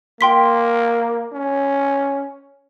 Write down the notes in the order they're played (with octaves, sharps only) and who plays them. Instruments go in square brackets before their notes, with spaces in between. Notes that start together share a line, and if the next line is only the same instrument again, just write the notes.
[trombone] A#3 [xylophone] G5 C6 B6
[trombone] C#4